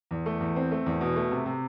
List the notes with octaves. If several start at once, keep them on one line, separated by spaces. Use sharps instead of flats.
E2
A3
E2
C4
A3
E2
B2
A3
C3
C3